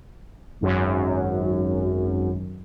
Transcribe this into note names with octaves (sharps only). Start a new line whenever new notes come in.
G#1 F#2